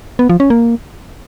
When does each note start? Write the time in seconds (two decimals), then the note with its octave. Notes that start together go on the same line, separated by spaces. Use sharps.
0.19 B3
0.29 F3
0.40 C#4
0.50 A#3